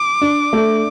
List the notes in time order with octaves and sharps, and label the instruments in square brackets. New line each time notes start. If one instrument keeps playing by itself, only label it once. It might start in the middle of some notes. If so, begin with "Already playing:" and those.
Already playing: [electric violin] D6
[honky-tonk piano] D4
A3